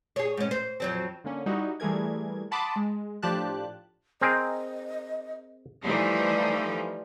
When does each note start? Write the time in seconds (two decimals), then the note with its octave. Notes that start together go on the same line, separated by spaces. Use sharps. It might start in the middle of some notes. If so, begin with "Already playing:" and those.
0.16 G#4 C#5
0.37 G#2 C#4
0.51 C5
0.80 F2 F#3 C4
1.24 D3 A#3 C#4
1.46 G3 D#4 E4 F#4
1.80 E3 G3 A3 G#4 A#4 G#6
2.51 F#5 A5 B5 C6 D6 D#6
2.76 G#3
3.22 A2 F3 D4 G4 A5 F#6
4.21 C4 G#4 A#4 D#5
5.84 E3 F3 G3 A3 D#4